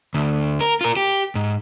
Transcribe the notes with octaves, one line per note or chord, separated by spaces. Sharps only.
D2
A#4
F4 A#4
G4
G#2